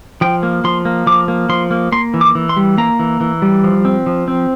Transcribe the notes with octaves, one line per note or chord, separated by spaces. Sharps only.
F3 G5
A#3
F3 C6
A#3
F3 D6
A#3
F3 C6
A#3
A#3 C6
E3
D6
E3
C6
G3
A#3 A#5
E3
E3
G3
F3
C4
F3
C4